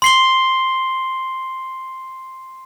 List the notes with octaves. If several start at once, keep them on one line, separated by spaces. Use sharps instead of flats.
C6 C7 G7